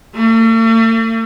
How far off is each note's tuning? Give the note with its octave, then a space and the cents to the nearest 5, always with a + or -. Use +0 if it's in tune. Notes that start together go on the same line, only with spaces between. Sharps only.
A3 +45